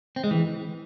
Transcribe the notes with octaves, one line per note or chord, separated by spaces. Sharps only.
C4
G#3
E3